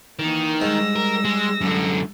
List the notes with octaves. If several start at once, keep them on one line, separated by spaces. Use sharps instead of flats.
D#3 E3 A#3
G#2 G3 E6 A#6
A#4
G#3
F#2 D3